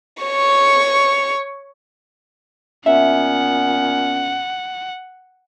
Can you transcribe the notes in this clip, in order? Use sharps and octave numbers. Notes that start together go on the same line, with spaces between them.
C#5 C#6
A#2 B3 C#4 E5 F#5